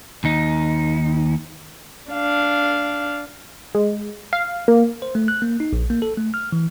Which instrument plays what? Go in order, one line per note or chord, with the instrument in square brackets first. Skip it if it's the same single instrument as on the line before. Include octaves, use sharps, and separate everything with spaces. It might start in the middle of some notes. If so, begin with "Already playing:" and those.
[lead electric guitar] D#2 D#4
[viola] D4 F5
[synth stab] G#3
F5
A#3
[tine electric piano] C5
A3
F#6
A#3
D#4
A#1
A#3
A4
A3
F6
E3